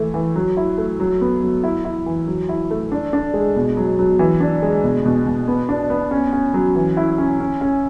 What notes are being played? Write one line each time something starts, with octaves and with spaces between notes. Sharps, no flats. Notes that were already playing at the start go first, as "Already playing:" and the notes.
Already playing: E3 A3
E3
F#3
E4
A3
F#3
B3
F#3
E4
E4
E3
F#3
E4
A3
D4
D4
G#3
B2
F#3
F#3
E3
D4
G#3
B2
B2
B2
B3
D4
B3
C#4
C#4
F#3
E3
E4
C#4
C#4
C#4